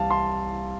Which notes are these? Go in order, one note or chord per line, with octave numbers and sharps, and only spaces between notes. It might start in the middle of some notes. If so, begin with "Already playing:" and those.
Already playing: C2 C3 E3 F5 A5
A5 C6